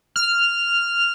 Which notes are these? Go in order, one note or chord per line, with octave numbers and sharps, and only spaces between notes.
F6